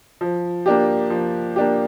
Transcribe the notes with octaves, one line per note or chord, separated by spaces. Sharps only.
F3
A#3 D4 G4
F3
A#3 D4 G4